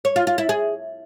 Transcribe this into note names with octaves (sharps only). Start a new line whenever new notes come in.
C#5
F4
F4
E4
G#4